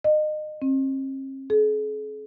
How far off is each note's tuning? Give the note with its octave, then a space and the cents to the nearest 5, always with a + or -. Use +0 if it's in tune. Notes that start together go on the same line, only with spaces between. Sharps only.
D#5 -30
C4 +45
G#4 +45